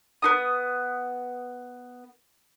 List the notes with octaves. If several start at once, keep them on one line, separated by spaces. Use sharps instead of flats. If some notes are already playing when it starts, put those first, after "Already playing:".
B3 D#4 D#6